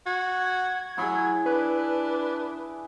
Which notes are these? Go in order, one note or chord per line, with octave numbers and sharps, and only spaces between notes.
F#4 G#6
F#3 E4 G#4
D4 B4